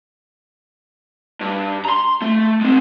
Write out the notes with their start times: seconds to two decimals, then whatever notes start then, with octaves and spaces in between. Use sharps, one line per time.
1.41 G2
1.85 A#5 C6
2.22 A3
2.61 G#3 C4